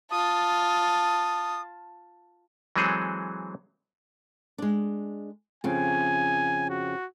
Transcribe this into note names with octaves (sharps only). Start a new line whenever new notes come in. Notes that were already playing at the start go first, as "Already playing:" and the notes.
F4 A5 D#6
E3 F#3 G#3 C4 G#4 A4
G#3 D4
F2 C#3 G#5
F#4